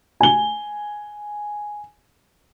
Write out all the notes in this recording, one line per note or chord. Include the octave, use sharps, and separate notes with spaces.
G#5 G7